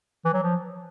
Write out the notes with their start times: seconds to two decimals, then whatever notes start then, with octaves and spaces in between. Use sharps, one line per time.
0.25 E3
0.34 F#3
0.43 F3